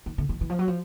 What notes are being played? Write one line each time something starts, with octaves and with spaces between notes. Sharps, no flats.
D#3
D3
D#3
E3
F3
F#3
F3